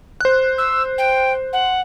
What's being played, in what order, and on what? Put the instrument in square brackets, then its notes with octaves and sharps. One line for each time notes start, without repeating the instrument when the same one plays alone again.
[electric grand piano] C5 F#6
[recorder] E6
G5
F#5